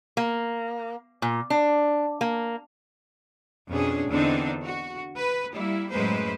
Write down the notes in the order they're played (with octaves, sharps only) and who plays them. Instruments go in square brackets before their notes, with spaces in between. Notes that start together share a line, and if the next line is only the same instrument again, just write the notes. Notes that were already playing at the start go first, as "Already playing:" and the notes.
[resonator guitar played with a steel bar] A#3
A#2
D4
A#3
[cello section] F2 B2 C#4 D4 G#4
E2 D3 C4 D4 D#4
F#4
B4
G3 A#3 E4
F#2 A2 G#3 A#3 B4 C5